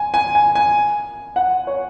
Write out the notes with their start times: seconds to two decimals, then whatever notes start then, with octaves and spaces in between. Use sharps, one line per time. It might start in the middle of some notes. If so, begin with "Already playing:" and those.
Already playing: G#5
0.14 G#5
0.35 G#5
0.55 G#5
1.36 F#5
1.67 C#5